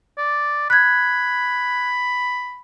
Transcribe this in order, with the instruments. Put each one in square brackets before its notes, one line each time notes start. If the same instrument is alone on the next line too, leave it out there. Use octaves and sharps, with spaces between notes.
[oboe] D5
[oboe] B5 [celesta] F#6 G#6